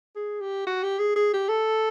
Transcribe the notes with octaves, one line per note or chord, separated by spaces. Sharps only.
G#4
G4
F#4
G4
G#4
G#4
G4
A4